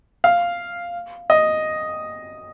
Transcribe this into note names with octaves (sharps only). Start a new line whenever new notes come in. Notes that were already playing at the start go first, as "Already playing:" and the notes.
F5
D#5